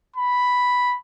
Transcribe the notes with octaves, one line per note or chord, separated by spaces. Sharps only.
B5